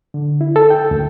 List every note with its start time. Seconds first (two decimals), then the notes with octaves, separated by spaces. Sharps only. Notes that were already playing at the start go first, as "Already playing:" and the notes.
0.14 D3
0.41 E4
0.56 A4
0.70 G5
0.91 D2